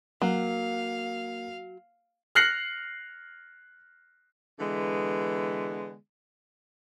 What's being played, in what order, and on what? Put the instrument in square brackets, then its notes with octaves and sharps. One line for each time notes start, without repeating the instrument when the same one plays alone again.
[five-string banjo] F#3 [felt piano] A#3 [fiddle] F5
[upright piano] F6 F#6 A#6 C7 C#7 F#7
[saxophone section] D3 E3 G#3 B3